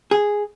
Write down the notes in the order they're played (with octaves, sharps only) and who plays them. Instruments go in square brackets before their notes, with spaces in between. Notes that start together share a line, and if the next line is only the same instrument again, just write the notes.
[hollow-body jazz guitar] G#4